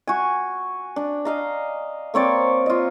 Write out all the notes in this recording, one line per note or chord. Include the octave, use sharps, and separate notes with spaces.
F#4 G#5
D4
D#5 F5 A#5
A#3 C4 C#5 D5
F4 D#5